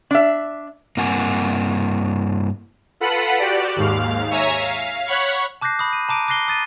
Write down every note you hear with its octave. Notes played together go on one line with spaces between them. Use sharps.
D4 E5
G2 A#3 C4 F#5 G#5
F4 A4 B4 F#5 B5
F#4 G4 D5
D#2 G#2 F5
C#5 E5 G#5 A#5 B6
F5
C#5 F#5 B5 C#6
A5 D6 F#6 G6 A#6 C7
B5 D#6
D#7
A5 A#5 D6 D7 D#7
D6 F#6 A#6 C7 G7
D#6 A6 D#7